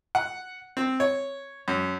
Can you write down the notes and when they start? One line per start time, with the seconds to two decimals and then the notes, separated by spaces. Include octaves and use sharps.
0.15 F#5
0.77 C4
1.00 C#5
1.68 F#2